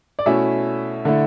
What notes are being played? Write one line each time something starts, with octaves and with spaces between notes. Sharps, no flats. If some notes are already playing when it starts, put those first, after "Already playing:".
D5
B2 A3 C#4 E4 E5
D3 A3 E4